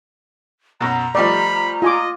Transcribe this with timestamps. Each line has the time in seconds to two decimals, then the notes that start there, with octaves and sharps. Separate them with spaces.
0.81 F#2 B2 A#5
1.15 F3 G3 A3 D5 D#5 B5
1.82 F4 D#5 G#5 D6